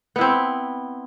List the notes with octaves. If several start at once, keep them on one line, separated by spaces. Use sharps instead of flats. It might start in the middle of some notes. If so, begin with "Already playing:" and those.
B3 C4 E4